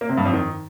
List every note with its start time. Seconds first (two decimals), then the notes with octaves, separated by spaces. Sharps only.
0.01 A#3
0.09 C3
0.17 G2
0.25 F2
0.34 D#3